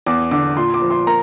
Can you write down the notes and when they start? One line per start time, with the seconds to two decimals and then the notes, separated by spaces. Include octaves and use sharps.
0.06 E2 D6
0.31 D3 D6
0.56 A#2 C6
0.74 D6
0.82 F3
0.90 C6
1.07 A#3 A#5